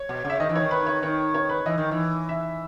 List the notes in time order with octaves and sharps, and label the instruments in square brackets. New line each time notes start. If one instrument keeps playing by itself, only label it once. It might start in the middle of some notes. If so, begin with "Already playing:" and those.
Already playing: [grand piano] C#5
[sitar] B2
C#3
[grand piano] E5
[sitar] D#3 [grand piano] D#5
[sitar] E3
[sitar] D#3 [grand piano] C#5
[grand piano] B4
C#5
[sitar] D#3 [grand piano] C#5
[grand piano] C#5
B4
[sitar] E3 [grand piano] D#5
[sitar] D#3
E3
[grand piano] E5